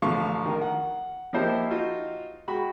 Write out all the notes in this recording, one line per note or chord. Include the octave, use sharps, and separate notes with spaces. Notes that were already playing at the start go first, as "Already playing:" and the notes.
A1 D3 F3 F5 C#6
D#3 A#4
F#5
F3 A#3 D#4 E4 G4 C5
D#4 F4 F#4
G#3 F#4 G5 B5